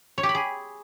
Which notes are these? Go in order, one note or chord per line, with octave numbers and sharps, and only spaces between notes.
C#5
G4
B5
G#4